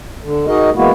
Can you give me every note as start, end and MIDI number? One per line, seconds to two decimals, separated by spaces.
0.23 0.46 50
0.47 0.70 63
0.47 0.70 66
0.47 0.70 68
0.47 0.70 70
0.47 0.70 75
0.76 0.92 52
0.76 0.92 56
0.76 0.92 58
0.76 0.92 59
0.76 0.92 64
0.76 0.92 66